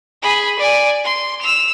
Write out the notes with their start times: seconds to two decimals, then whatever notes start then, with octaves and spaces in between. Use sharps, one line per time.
0.22 G#4 B5
0.59 D5 G#5
1.04 C6
1.41 E6 F7